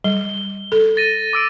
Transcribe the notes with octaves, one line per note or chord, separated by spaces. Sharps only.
G3 G7
A4
A6 A#6 D#7
D6 E6 D7